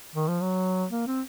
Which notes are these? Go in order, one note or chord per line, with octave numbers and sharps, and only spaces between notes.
D#3
F3
F#3
A#3
C4